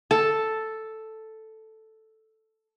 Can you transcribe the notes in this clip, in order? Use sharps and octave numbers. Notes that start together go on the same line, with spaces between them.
A4 A5